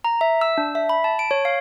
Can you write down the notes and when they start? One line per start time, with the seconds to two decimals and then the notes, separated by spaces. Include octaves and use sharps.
0.04 A#5
0.21 E5
0.41 E6
0.58 D4
0.75 E5
0.89 B5
1.04 A5
1.19 D7
1.31 C#5
1.45 F5